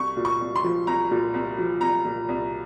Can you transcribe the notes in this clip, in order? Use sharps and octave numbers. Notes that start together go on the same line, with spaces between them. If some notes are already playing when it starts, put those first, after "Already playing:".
Already playing: C2 C#6
A#2
C#6
C2
C6
F3
C2 A#5
A#2
C2
F3
C2 A#5
A#2
C2